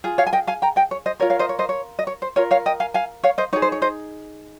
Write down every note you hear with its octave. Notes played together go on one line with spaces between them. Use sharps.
F4 G#4
C#5 F5
G#5
D#5 G5
F5 G#5
G5 A#5
D#5 G5
C#5
C5 D#5
F4 A#4 C#5
C#5 F5
C5 D#5
C#5
C5 D#5
C#5
D#5
C#5
C5
F4 A#4 C#5
C#5 F5
D#5 G5
F5 G#5
F5 G#5
C#5 F5
C5 D#5
D#4 G#4 C#5
C5
C#5
C5 D#5